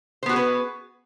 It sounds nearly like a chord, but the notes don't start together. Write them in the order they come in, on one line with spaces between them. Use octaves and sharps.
C5 B3 F#4 G#4 B4